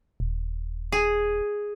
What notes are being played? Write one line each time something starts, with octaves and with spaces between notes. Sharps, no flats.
D#1
G#4